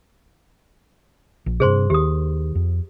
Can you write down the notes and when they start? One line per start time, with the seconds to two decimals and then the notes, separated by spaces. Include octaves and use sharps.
1.46 A#1
1.60 G2 C3 G#4 C5 C6
1.90 D#2 D#3 G4 D#6
2.55 F2